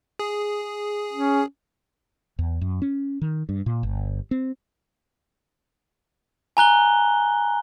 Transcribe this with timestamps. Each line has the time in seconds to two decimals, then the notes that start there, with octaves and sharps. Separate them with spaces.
0.19 G#4
1.13 C#4
2.39 E2
2.61 F#2
2.82 C#4
3.21 D#3
3.49 G2
3.66 A#2
3.83 G1
4.31 C4
6.57 G#5 A#5 F#6 G7